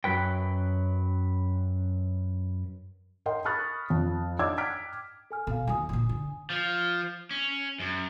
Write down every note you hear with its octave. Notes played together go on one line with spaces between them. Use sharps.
F#2 F#3 B4 G5
A#4 D#5 G5 C6
B5 C#6 D#6 F6 F#6 A6
F2
D5 D#5 D6 E6 G#6
G5 D6 F6 F#6 B6 D7
A4 G#5 F6
B2 A4 F5
D#2 F#3 G#5 D#6
A#2 D3
D3
F3
C#4
F#2